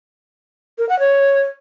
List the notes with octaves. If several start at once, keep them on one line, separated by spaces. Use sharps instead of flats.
A#4
F#5
C#5